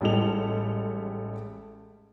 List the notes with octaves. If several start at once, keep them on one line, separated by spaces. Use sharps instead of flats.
A1 G3 G#3 D#4 A4 F7